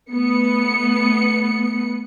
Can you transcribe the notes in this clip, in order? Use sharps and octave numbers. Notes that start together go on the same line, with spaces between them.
A3 B3 C#7